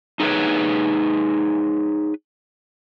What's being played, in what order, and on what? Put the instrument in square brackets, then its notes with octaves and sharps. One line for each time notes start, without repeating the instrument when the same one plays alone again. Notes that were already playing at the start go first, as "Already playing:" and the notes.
[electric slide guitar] D#4 G#4 A#4 B4 C#5